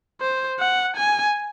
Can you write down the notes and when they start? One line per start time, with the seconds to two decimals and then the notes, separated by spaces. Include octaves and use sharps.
0.20 C5
0.59 F#5
0.96 G#5